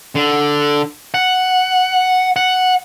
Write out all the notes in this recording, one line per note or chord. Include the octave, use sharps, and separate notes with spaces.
D3
F#5
F#5